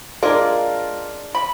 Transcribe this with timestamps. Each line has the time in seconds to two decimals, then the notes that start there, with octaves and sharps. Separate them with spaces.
0.23 G#3 A#3 D4 F4 A#4
1.35 B5